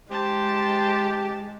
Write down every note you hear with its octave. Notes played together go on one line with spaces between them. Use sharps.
G#3 G4 C5 A5